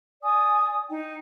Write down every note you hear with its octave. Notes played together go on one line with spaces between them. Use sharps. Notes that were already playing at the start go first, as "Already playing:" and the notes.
D5 G#5 D#6
D#4 G5